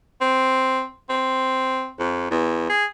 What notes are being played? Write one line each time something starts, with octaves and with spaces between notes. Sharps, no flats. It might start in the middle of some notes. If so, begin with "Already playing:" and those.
C4
C4
F2
E2
G#4